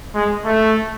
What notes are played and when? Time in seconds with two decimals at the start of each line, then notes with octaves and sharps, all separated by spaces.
0.15 G#3
0.45 A3